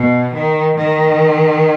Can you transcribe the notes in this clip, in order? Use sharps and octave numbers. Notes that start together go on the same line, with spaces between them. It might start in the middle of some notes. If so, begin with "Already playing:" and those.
Already playing: B2
D#3
D#3